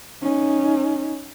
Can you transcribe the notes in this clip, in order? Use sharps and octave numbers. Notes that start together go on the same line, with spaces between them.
C#4 D#4